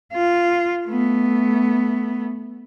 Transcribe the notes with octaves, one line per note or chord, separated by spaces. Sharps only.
F4
A3 B3